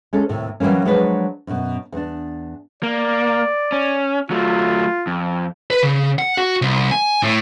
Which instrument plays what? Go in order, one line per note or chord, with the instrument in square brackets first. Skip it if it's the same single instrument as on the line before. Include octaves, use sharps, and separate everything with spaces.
[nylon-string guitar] G#3 C#4 A4
D#2 A2 C3
E3 F#3 G3 A#3 C#4
F3 F#3 G#3 D4 B4 C#5
F#2 B2
E2 D4
[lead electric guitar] A#3 [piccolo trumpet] D5
[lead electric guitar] C#4
[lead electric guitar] F#3 A3 [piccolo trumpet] F4
[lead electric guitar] F2
B4
C#3
F#5
F#4
C2
G#5
A2